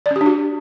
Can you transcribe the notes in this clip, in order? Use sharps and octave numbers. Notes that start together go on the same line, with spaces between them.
D5
C#4
G4
D4
F#4